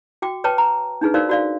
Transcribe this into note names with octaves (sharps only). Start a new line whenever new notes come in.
F#4 G5 D6
B4 C#5 G5 A5 D6
A#5
D4 D#4 G#4 B4
D#4 F#4 A#4 C5 D5 F5
F#4 D5 F5